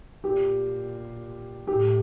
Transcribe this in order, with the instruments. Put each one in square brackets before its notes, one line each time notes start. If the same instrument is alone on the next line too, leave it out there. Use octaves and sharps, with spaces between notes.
[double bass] A#2 [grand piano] G4
[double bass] A2 [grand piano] G4